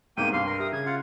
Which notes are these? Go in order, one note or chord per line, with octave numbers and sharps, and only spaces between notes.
C2 G#2 A#3 B3 G5 D#7
G2 F5 G5 C6
A#4
G4 E5 D#6
C#3 G#6
F4 F5 F#5